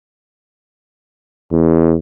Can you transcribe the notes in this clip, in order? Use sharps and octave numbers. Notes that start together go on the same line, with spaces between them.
E2